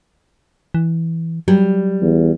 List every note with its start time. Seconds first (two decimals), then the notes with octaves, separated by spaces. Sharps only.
0.75 E3
1.48 F#3 G3
2.02 E2